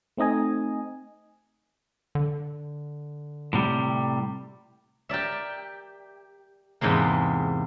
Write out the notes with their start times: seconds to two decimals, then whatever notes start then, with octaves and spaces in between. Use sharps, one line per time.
0.17 A3 C4 D#4 D#5 G#5
2.15 D3
3.53 A2 C3 G3
5.09 G4 A#4 D5 E5
6.81 E2 G#2 C3 G#3 A#3